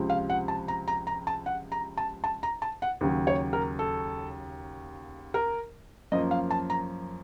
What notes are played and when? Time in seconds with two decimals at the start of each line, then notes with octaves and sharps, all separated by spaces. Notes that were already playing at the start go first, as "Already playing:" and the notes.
Already playing: C#2 C3 F3
0.10 F5
0.30 F#5
0.48 A5
0.68 A#5
0.88 A#5
1.07 A#5
1.27 A5
1.46 F#5
1.72 A#5
1.98 A5
2.24 A5
2.43 A#5
2.62 A5
2.82 F#5
3.01 D#2 C#3 F#3
3.27 C#5
3.53 A#4
3.79 A4
5.34 A#4
6.12 F#2 F3 A#3 D#5
6.31 F5
6.51 A5
6.70 A#5